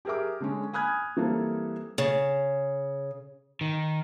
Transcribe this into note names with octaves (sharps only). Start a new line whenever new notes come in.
G4 G#4 A#4 E5 D6
D3 G#3 C#4
G#5 B5 D#6 F6 F#6 G#6
E3 G3 A#3 C4 A4
C#3
D#3